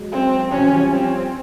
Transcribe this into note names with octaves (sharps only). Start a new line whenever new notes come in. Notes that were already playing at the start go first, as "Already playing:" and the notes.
Already playing: F#3 G#3
C4
E3 F#3 C#4
F3 G3
C4